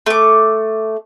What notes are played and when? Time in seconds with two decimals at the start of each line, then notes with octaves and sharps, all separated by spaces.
0.06 A3 D6